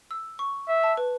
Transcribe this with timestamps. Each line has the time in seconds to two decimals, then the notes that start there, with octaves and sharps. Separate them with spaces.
0.11 E6
0.39 C#6
0.68 E5
0.84 A5
0.97 B4